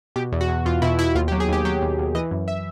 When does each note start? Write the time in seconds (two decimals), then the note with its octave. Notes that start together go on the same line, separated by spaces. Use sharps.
0.16 B2 G4
0.32 E2
0.41 F#4
0.49 E2
0.66 E2 F4
0.82 B2 E4
0.99 B2 E4
1.15 D#2 F4
1.28 G4
1.32 F#3
1.40 G#4
1.49 D#2 G4
1.65 F#3 G4
1.82 D#2
1.99 D#2
2.15 E3 D#5
2.31 F#2
2.48 E5